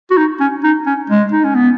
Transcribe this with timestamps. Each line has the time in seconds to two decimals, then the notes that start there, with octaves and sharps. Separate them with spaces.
0.11 F#4
0.17 D#4
0.40 C#4
0.64 D#4
0.86 C#4
1.10 G#3
1.32 D#4
1.44 C#4
1.55 B3